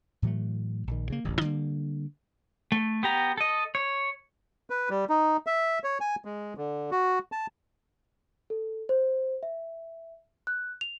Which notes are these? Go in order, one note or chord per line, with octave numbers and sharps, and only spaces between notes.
A2 E3 F#3 A3
A#1 D#3
C#3 A#3
D1 A1 D#2
D3 G3 A#3
A3
B3 G4 A#5
A4 D#5
C#5
B4
G3
D#4
E5
C#5
G#5
G#3
D3
F#4
A5
A4
C5
E5
F#6
F7